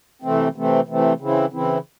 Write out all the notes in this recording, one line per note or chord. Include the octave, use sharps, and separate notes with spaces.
C3 E3 A3 C4
C3 E3 A3 C4
C3 E3 A3 C4
C#3 E3 C4 E4
C#3 E3 C4 E4